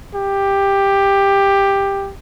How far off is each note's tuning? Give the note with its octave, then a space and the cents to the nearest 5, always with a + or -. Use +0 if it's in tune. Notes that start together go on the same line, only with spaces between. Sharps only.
G4 +10